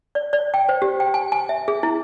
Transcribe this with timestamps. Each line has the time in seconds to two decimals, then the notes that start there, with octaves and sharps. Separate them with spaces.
0.15 D5
0.33 D5
0.54 G5
0.69 C5
0.82 G4
1.00 G5
1.14 G#5
1.32 G#5
1.49 E5
1.68 G#4
1.83 E4